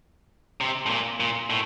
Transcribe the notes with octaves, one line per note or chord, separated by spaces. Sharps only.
C3
A2
A#2
A#2
A2